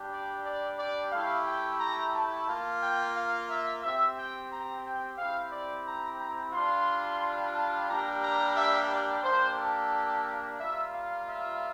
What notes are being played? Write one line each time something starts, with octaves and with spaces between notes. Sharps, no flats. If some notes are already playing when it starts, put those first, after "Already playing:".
Already playing: G3 D4 G4
D5
D5
D5
A3 E4 G4 F5
G5
A#5
A5
A#3 F4
G5
F5
E5
C4 G4 E5
G5
A#5
G5
C4 E4 G4 F5
D5
A#5
A#5
G3 D4 F4 C6
A5
G3 A#3 D4 G4 A#5
A#5
E5
D5
A#3 D4 G4 C5
A4
G3 A#3 F4 E5
F5
E5